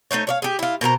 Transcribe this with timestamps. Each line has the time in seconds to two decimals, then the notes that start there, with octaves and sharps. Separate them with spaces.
0.11 A3 D#4 C5 C#5
0.27 C#5 D5 F5
0.42 G4 G#4
0.59 E4 F4
0.81 B2 A#4 C5 A#5